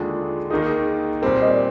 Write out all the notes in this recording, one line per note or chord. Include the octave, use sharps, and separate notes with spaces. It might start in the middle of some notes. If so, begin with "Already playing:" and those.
Already playing: D#2 D3 G#3 D4 F4
D#2 D#3 A#3 D#4 G#4
A#2 G3 C4 A#4
D#5
D5